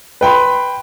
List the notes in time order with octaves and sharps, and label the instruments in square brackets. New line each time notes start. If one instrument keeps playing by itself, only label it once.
[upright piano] B4 G5 B5 C6